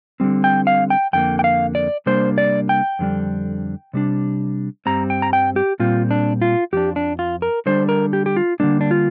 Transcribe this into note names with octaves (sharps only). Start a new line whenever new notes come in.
D3 G3 C4
G5
F5
G5
F2 D3 A#3 G5
G5
F5
D5
C3 G3 A#3 D4 C5
D5
G5
F2 D3 G3 D4
C3 G3 D4
G2 G3 C4 A#5
G5
A#5
G5
G4
A#2 G3 C4 F4
D4
F4
F2 F3 D4 G4
D4
F4
A#4
D3 G3 D4 C5
A#4
G4
G4
F4
D3 G3 A#3 D4
D4
F4